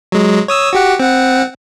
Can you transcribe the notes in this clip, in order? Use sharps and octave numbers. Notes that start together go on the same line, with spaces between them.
F#3 G#3
C#5 D#6 E6
F#4 G4 F#5
C4 F#5